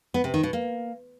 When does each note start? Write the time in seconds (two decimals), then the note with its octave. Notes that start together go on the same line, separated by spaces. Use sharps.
0.14 B3
0.24 C3
0.34 D#3
0.43 B2
0.53 A#3